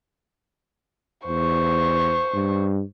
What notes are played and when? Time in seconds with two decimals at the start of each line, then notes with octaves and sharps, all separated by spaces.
1.27 E2 C5 C#6
2.34 G2